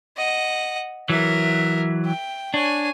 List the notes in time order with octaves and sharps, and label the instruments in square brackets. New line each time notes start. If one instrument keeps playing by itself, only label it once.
[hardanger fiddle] D#5 F#5
[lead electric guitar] E3 F#3 [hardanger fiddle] A#4 E5
[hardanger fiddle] G5
[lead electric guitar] D4 [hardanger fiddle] C#5 G#5